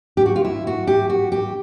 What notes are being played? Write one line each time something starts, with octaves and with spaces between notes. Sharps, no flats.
G4
F#4
F4
E4
F#4
G4
F#4
G4